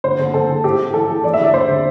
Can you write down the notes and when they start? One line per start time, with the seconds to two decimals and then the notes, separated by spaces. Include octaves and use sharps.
0.04 D3 C5
0.19 D3
0.34 D3 A4
0.49 D3
0.64 A2 G4
0.79 A2
0.94 E3 A4
1.09 E3
1.24 E2 D5
1.34 E5
1.39 D3 D5
1.53 D3 C5
1.69 D3